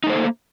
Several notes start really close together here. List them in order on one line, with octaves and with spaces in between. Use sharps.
D#4 A3 C5 A4 A#3